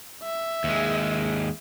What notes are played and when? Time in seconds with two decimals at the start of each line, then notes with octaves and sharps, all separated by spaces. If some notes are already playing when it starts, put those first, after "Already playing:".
0.24 E5
0.64 D#2 G#3